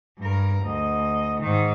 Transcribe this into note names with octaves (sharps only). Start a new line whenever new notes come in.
G2 A#4
D2 D#5
G#2 D#3